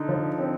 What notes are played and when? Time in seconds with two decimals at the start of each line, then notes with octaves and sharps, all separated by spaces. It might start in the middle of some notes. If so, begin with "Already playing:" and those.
Already playing: D3 D#4
0.09 F3
0.39 C4